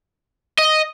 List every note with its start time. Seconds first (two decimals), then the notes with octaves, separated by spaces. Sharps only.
0.58 D#5